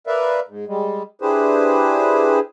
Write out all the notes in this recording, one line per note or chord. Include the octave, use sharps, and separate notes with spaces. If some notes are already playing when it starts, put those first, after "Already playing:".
A#4 B4 D5 E5 F5
G#2
G3 G#3
D4 E4 G4 G#4 B4 C5